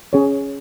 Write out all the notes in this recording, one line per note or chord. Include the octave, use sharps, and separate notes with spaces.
C#4 G#4 C#5